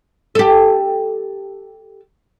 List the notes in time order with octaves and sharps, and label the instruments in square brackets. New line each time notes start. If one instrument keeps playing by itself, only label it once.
[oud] G4 A4